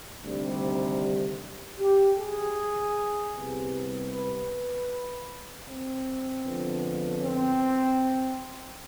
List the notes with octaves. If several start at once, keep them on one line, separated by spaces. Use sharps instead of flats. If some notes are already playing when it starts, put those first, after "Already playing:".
D2 C3 D#3 G3
G4
G#4
C2 C3 G3 B3
B4
C4
F2 D3 F3 G#3 B3
C4